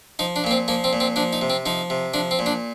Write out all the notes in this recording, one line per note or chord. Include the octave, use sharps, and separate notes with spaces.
F3 D#4
D4
A#2 A#3
C4
F3 A#3
C4
A#2
C4
F3 D4
D#4
C3
C4
F3 D#4
C3
F3 D4
C4
A#2
D4